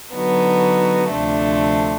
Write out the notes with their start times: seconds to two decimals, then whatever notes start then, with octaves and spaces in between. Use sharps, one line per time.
0.14 D3 F#3 B3 D#4 F#4
1.11 D2 C3 F3 A3 D4